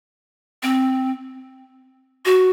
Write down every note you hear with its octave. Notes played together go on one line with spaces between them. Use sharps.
C4
F#4